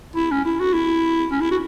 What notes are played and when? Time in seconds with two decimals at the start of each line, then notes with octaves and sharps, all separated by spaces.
0.16 E4
0.31 C#4
0.45 E4
0.60 F#4
0.74 E4
1.32 C#4
1.41 E4
1.51 F#4